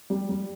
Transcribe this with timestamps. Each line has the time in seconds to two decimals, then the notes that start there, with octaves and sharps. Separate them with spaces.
0.10 G3
0.29 G3